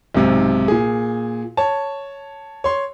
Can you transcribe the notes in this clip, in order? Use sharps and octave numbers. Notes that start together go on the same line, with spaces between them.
B1 G#2 C3
A#2 G#4
C#5 A5
C#5 C6